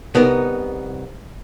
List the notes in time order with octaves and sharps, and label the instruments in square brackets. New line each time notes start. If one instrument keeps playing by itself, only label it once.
[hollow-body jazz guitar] C2 B3 D#4 A#4